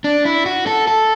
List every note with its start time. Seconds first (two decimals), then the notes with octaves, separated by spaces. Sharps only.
0.04 D4
0.25 E4
0.46 F#4
0.67 A4
0.87 A4